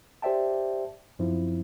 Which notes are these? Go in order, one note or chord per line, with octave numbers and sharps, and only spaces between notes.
G4 C5 D5 E5 G5 A5
F#2 F3 C4 E4